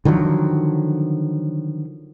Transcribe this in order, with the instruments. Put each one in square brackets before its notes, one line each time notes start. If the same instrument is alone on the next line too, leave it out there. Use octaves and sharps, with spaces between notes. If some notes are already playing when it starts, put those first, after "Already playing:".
[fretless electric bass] D3 D#3 F3 F#3